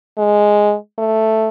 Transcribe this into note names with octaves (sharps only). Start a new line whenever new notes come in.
G#3
A3